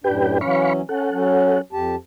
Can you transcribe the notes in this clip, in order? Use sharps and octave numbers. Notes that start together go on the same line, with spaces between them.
F#2 A2 D4 G4 B4 G5
E3 F#3 C#4 F5 B5 C#6
C#4 A4 F#5
F#3 C#4
F2 G4 A5